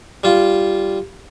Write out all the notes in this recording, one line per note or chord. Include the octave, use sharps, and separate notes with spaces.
G3 F4